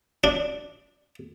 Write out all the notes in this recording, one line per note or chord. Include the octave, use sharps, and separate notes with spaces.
D4